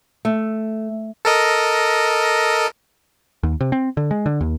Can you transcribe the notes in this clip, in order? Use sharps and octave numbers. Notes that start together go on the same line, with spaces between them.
A3
A4 A#4 D#5
D#2
C3
C4
D3
G#3
D3
D#2